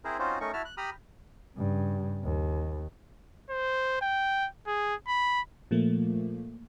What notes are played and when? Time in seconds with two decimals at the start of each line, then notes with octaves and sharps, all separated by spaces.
0.05 C4 E4 G#4 A#4 C5
0.19 C4 C#4 D#4 F4 F#4 C5
0.41 A3 C#4 D#4 A#4 C#6
0.53 E4 F#4 E5 A5 F6
0.65 F#6
0.77 G4 A#5 B5 D#6 F6
1.57 G2 C#3
2.23 D#2
3.50 C5
4.01 G5
4.67 G#4
5.08 B5
5.71 A#2 F3 A3 A#3